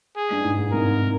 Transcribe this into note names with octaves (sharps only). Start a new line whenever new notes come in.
G#4
G2
G#2
G#2
G#2 C3 A#4